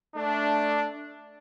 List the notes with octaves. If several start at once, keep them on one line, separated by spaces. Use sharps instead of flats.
A3 D4